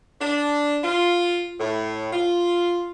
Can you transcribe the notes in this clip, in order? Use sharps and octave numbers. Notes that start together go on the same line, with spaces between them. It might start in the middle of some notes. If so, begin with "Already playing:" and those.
D4
F4
A2
F4